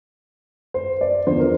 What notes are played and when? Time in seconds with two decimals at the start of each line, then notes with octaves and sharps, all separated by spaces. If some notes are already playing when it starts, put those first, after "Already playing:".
0.74 C5
1.01 D5
1.27 E2 D3 F3 C5
1.39 A#4